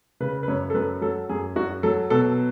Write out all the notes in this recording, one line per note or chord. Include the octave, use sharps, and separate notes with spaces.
C#3 B4
B4
F#2 C#5
A4
F#2 B4
F#3 A4
F#2 G#4
F#2 F#4
F#3 A4
B2 A4